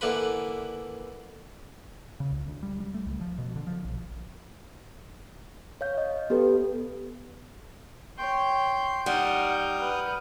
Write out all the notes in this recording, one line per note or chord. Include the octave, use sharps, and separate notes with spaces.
D3 E3 A#3 B4 B5
C#3
C#2
D2
G3
G3
A3
C#2
F3
B2
D3
F3
A#1
C#5 F5 G6
D#5
B3 G4 A4 B4
C#5 G5 C6 G6
G3 D#4 F#5 D#6 F6 G6
B4 F#5